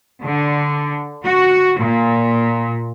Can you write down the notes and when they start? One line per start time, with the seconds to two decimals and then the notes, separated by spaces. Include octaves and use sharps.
0.22 D3
1.24 F#4
1.79 A#2